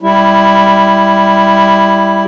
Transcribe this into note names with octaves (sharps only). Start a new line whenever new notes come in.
G3 E4